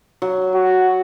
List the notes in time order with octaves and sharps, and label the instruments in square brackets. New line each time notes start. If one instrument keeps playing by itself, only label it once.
[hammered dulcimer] F#3
[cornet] F#4